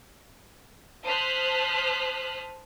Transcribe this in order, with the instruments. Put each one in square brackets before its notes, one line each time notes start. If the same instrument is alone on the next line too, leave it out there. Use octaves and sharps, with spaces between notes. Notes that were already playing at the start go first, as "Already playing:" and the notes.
[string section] C5 A5 D#6 F6 F#6 B6